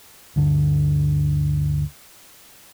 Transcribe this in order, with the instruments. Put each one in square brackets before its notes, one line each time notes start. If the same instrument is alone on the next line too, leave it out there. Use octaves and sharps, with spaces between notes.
[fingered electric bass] D2 G2 D3 D4